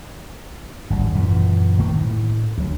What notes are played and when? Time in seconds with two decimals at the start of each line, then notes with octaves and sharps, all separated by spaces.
0.90 G#1 D2 G3
1.14 F#2 A#2 E3
1.78 A#1 D#3 A3 A#3
1.94 A2
2.58 D2 F#3